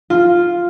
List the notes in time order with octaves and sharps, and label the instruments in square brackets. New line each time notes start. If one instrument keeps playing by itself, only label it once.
[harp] F4